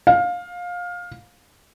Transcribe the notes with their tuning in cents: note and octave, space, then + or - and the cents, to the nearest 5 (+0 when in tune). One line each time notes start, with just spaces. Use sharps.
F5 +20